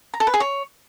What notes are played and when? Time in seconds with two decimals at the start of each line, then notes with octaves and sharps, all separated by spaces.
0.14 A#5
0.20 A4
0.27 B4
0.34 G#4
0.40 C#5